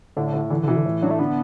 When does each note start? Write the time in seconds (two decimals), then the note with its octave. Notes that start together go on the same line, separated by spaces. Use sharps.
0.17 A2 D3
0.34 A2
0.50 D3 E3
0.63 D3
0.68 B2 E3
0.76 D3
0.86 A2
1.02 F#3 D4
1.11 A3
1.19 D3 B3